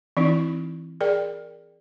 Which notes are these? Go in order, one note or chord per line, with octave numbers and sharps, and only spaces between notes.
E3 C4 D#4 E4
G#4 A#4 D5 G5